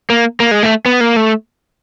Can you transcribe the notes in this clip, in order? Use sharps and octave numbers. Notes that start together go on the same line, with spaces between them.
A#3
A#3
G#3
A3
B3
A#3
A3